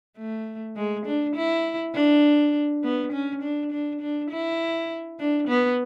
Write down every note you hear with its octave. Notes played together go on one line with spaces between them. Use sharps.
A3
G#3
D4
E4
D4
B3
C#4
D4
D4
D4
E4
D4
B3